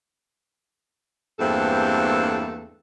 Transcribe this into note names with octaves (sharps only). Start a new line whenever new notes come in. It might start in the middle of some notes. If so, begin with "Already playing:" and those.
E2 G2 A3 A#3 C4 A4